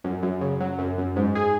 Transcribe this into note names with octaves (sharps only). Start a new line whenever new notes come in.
F#2
F#2
C#3
F#3
F#2
F#2
G#2
G#4